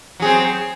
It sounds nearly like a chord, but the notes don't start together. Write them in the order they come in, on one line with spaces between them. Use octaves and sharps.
F#3 G#4 C4